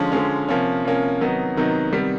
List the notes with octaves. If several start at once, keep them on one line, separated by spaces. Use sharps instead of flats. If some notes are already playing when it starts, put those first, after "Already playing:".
Already playing: D3 F3 G#3 C#4
D3 F3 G#3 C#4
C3 F3 A#3 C#4
C3 F3 A#3 C#4
C3 D#3 F#3 B3 D#4
C3 D#3 F#3 B3 D#4
C3 D#3 G3 B3